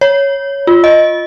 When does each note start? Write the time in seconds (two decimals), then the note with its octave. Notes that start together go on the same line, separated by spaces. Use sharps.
0.01 C#5
0.67 F4
0.84 D#5